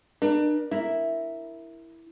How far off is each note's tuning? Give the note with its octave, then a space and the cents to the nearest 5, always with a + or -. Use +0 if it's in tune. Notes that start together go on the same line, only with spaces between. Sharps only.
D4 +35 A#4 +40
E4 +0 A#4 +0